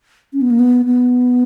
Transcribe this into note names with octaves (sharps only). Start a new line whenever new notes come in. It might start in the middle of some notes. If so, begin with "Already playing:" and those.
C#4
B3
A#3
B3
B3